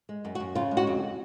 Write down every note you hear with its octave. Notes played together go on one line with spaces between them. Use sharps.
G#3
F#2
F#4
F#2
C#3 F4
G#3
F#4
F2